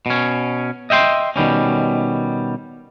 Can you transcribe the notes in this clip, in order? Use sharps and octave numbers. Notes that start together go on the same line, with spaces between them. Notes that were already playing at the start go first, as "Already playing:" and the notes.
B2 C#4
D#5 E5 G5 C6
B2 D#3 G3 C#4